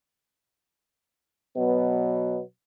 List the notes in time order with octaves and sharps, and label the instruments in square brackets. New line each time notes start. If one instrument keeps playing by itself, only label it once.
[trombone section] B2 F#3 B3